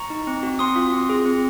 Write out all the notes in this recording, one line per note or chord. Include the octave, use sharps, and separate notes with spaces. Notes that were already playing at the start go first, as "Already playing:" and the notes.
Already playing: A#5 C#6
D#4
C4
F#4
C4 C6 D#6
F4
C4
G#4
C4